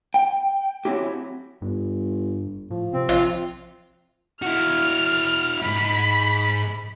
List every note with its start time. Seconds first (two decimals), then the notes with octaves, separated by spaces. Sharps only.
0.14 G5
0.85 F#3 C4 C#4 E4 G4
1.62 G1 G2
2.70 A2 F3
2.93 C3 C4
3.09 A#1 F3 F4
4.42 E4 F#4 F6
5.63 F2 G#2 B5